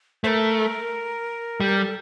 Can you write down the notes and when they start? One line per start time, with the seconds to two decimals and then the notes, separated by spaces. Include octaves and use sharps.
0.24 A3 C5
0.27 A#4
1.60 G3 A4
1.69 A#4
1.78 A4